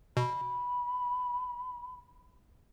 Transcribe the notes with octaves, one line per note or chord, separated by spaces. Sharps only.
B2 B5